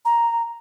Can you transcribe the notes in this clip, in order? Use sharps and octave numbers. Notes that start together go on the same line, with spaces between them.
A#5